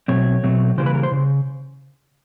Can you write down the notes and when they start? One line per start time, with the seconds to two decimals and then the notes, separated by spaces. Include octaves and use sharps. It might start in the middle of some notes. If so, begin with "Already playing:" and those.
0.08 B2 F#3 A3 C4 C#5
0.43 B2 F#3 A3 C4
0.78 C#3 E3 G3 A#3 C5
0.86 B4
0.95 A#4
1.03 C5
1.12 C#3